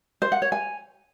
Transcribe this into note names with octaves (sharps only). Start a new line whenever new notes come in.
C5
F#5
C#5
G#5